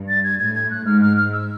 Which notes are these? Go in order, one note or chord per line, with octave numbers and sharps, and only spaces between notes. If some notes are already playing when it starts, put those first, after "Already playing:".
Already playing: G2
A6
G#6
A2 G#6
G#6
F#6
G#2 F6
F6
F6
E6